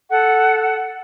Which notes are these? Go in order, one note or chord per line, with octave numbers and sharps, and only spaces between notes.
A4 F#5